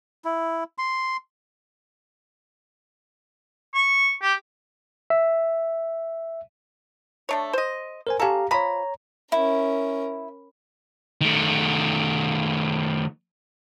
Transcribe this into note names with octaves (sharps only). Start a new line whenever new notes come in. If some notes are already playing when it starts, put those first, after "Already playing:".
E4
C6
C#6
G4
E5
A3 D4 C#5
C5 D#5
A#4 C5 G#5
C#4 G4 A4 F5 A#5
F3 C#5 A#5 B5
C#4 E4 A#4
D#3 A3